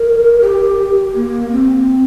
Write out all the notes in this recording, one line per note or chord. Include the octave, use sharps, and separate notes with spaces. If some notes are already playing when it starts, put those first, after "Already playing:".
Already playing: A#4
G4
A#3
C4